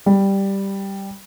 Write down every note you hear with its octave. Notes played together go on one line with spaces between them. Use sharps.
G3